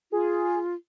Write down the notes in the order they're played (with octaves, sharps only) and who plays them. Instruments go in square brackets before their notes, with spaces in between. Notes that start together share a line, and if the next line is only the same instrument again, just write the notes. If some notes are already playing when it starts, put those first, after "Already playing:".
[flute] F4 [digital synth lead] G#4